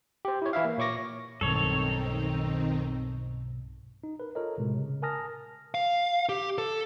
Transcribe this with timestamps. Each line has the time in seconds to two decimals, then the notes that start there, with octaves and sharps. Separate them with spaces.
0.25 G4 C5
0.42 E4 C#5
0.53 E3 E4 E5 F5
0.65 A#3
0.78 A#2 C#5 C#6 D6 A#6
1.41 B1 G2 D#3 C4 D#4 A4 C#5
4.04 D#4
4.20 A#4 B4
4.35 F4 A4 A#4 C#5 D#5
4.58 A2 C3 G#3
4.77 C#3
5.02 A#4 G#5 A5 D#6 F6 A#6
5.74 F5
6.29 G4
6.58 A4